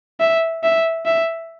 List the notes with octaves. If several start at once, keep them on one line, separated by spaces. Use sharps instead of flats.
E5
E5
E5